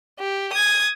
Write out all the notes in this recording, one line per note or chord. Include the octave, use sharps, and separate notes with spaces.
G4
D#6 G#6